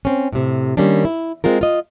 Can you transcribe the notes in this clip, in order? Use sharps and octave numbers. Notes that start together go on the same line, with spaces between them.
C4 C#4
A2 C3
D#3 G3 A#3 C#4 D4
E4
G#3 C4 F4 A#4
F4 D#5